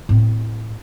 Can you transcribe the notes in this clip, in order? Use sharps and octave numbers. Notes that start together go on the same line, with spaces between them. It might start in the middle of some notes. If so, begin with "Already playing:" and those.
A2 C4